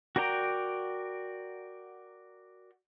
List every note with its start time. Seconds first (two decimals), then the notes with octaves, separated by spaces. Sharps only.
0.16 F#4 A#4 D5 G5 A#5